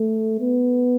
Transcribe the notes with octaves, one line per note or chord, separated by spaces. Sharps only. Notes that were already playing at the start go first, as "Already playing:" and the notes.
Already playing: A3
B3